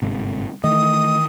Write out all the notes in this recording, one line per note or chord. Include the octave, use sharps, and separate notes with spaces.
G1 G#2 C3
D#3 E3 A3 D#5 D#6